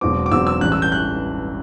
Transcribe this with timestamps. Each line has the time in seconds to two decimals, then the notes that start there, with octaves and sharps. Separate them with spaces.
0.01 E1 E2 B2 F#3 C4 D6
0.26 D6
0.31 E1 E2 B2 F#3 C4 E6
0.47 E6
0.61 A1 G2 E3 F#6
0.72 E6
0.82 G6
0.92 E3 F#6